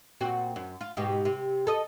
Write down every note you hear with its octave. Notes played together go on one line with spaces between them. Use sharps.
A#2 C4 F#4
F#2
F4
G#2 B2 G4
C3
A4 D#5